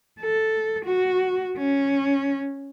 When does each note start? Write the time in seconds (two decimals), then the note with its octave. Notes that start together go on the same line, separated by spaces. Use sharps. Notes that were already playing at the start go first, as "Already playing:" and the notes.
0.20 A4
0.85 F#4
1.58 C#4